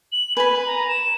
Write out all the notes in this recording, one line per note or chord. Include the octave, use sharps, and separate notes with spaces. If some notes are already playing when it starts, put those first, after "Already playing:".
F#7
B4 G#5 B5
A#5
E7